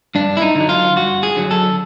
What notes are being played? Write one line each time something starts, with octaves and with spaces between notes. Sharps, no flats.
G2 D4
E4
D#4
D3
F#3
F4
G2 F#4
G#4
D3 F#3
A4